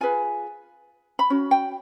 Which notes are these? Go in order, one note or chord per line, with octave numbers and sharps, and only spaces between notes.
F4 G#4 B4 G#5
B5
C#4 F#4
G5